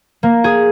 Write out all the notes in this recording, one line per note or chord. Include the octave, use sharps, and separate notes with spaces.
A#3
G#4